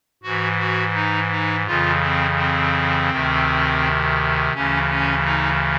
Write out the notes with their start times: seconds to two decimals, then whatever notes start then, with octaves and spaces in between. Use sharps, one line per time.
0.23 G#2 E3 F#4
0.59 F#4
0.95 D#4
1.31 D#4
1.66 F2 C#3 E3 F4
2.02 C4
2.37 C4
3.10 D2 C3 D#3
4.53 D2 C#3 E3 C#4
4.90 C#4
5.25 D#4